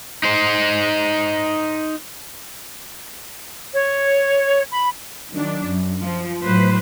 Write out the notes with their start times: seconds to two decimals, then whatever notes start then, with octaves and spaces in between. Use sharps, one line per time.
0.23 D#4 C5
3.74 C#5
4.71 B5
5.31 D#3 F#3 D4
5.65 F#2
6.02 F3
6.43 A2 F#3 B4 C5